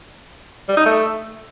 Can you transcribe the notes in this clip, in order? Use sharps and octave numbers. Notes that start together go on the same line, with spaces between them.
G3
D#4
A3